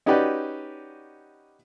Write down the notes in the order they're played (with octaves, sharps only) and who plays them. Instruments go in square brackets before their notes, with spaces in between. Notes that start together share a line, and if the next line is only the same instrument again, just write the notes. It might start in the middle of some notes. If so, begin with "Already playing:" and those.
[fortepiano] C#4 D#4 F#4 G4 B4 D5